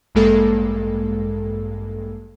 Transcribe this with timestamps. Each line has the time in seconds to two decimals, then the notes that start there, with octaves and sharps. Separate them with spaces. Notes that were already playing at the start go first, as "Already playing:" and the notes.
0.15 A1 G2 G#3 A#3 A4